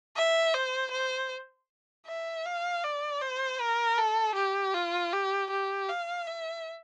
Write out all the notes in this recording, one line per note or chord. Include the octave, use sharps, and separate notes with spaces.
E5
C5
C5
E5
F5
D5
C5
A#4
A4
G4
F4
G4
G4
F5
E5